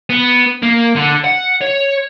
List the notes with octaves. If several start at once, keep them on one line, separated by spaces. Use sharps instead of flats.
B3
A#3
D3
F#5
C#5